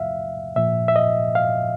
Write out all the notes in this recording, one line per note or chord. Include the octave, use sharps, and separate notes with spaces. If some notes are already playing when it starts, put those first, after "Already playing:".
Already playing: E2 C3 F3 E5 F5
A#2 F3 E5
E5
D#5
F5